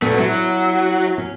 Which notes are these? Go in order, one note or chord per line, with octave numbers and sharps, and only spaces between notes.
D2 A#2 A3 B3
F#3 E4
C#4